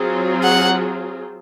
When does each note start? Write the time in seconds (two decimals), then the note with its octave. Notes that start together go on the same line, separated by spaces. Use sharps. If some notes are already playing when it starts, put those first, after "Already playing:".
Already playing: F#3 C4 F4 G#4
0.44 F#5